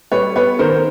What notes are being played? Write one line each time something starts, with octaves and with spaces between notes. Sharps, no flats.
G3 B4 C#5
B3 B4 C#5
D#3 A#4 C5